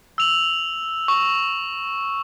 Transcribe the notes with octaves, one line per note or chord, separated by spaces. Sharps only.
E6 F7 F#7
C#6